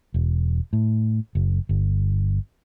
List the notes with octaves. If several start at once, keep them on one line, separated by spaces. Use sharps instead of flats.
E1
A2
F#1
G1